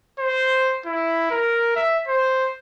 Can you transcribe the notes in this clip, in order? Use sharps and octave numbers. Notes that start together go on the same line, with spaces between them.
C5
E4
A#4
E5
C5